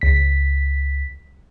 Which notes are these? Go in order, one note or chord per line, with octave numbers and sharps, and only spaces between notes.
C#2 B6